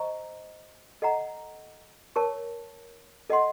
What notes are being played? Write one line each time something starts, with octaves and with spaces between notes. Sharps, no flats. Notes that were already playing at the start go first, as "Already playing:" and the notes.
Already playing: C5 D#5 A#5 C#6
A4 D#5 F#5 A#5
A#4 C#5 A5 C#6
A4 D#5 F#5 C6